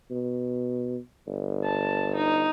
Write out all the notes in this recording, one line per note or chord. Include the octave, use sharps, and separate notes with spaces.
B2
G1
A5
D#4